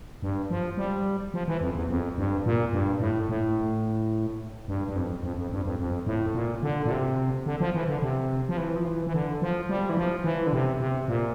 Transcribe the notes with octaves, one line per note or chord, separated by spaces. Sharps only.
G2
F3
G3
F3
E3
F2
E2
F2
G2
A#2
G2
A2
A2
G2
G2
F2
F2
F2
G2
F2
F2
A2
A#2
D3
A#2
C3
D3
F3
E3
D3
C3
F3
E3
F3
E3
E3
D3
F3
G3
E3
F3
E3
D3
C3
C3
A#2